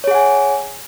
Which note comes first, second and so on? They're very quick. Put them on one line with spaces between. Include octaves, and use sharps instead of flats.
C#5 G#4 F#5 G#5